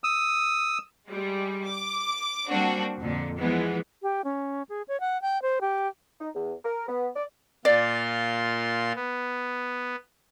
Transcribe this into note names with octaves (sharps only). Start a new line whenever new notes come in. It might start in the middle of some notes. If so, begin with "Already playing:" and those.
D#6 E6
G3 G#3
D6
G3 A#3 C4 D4 F#4
F2 A#2 D3
E3 F3 G#3 B3
G4
C#4
G#4
C#5
F#5
G5
C5
G4
D#4
E2
A#4
B3
D5
A#2 F4 D5 C6
B3